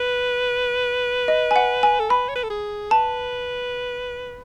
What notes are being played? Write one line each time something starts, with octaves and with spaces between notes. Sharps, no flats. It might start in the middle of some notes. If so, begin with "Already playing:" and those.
Already playing: B4
D#5
G#5
F#5
G#5
A4
B4 B5
C#5
B4
A4
G#4
B4 A5